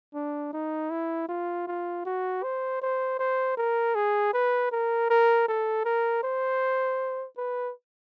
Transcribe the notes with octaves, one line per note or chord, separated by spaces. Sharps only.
D4
D#4
E4
F4
F4
F#4
C5
C5
C5
A#4
G#4
B4
A#4
A#4
A4
A#4
C5
B4